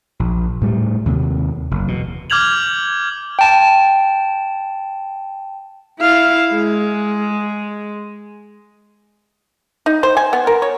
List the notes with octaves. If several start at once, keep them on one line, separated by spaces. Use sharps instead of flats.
A#1
A2 G3 A3
D#2 C3
F#1
E2 B2
D6 F6 G6 G#6 F7 F#7
G5 A5
E4 F5
G#3
D#4
C5
G#5
B3
A#4
C#5